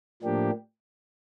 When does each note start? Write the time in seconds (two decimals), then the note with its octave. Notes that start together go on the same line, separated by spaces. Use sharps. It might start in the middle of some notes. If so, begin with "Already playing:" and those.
0.22 A2 F3 A#3 D4 G4